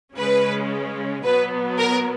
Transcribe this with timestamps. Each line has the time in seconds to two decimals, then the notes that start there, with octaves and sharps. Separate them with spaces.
0.16 C#3 G#3 C#4 B4
1.23 B2 F#3 B3 B4
1.78 A#4